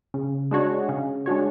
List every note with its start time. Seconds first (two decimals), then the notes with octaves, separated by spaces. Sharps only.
0.14 C#3
0.51 G#3 D4 F#4 C#5
0.89 C#3
1.26 G#3 D4 F#4 C#5